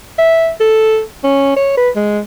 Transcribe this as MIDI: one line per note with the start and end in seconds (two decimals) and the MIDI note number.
0.18 0.50 76
0.60 1.01 69
1.24 1.53 61
1.56 1.74 73
1.77 1.90 71
1.96 2.20 56